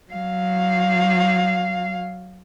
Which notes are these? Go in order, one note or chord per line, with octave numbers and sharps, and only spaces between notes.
F#3 F5